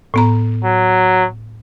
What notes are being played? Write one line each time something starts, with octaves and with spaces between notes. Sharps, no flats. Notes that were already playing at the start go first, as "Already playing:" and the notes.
A2 B3 A#5
F#3